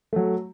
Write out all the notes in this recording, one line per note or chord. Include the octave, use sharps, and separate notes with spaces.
F#3 A3